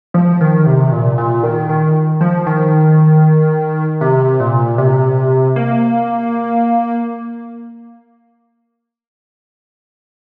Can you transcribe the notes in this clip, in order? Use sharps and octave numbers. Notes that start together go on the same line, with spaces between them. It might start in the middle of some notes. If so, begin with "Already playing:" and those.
F3
D#3
C3
A#2
A#2
D#3
D#3
F3
D#3
C3
A#2
C3
A#3